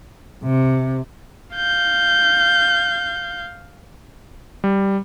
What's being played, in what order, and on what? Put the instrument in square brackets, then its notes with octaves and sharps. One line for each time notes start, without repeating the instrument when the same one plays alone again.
[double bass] C3
[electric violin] F5 G6
[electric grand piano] G3